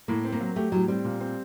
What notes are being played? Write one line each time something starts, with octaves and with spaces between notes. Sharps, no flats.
A2 A#3
C4
A#3
F#3
A3 G4
A2 F#3
G3 C4
A#2
C4